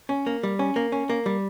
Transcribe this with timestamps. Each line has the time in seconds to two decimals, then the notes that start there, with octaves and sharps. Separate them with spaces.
0.09 C#4
0.27 A#3
0.43 G3
0.59 C#4
0.76 A#3
0.92 C#4
1.10 A#3
1.26 G3